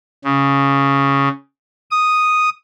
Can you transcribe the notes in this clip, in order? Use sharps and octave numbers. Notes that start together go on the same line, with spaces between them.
C#3
D#6